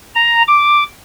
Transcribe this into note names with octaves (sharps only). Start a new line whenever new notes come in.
A#5
D6